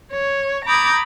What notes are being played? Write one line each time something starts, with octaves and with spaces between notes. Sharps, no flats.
C#5
A#5 B5 D6 D#6 G6 G#6